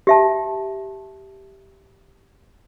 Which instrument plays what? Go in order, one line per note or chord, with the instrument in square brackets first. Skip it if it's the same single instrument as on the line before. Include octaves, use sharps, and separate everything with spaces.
[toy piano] G4 E5 A5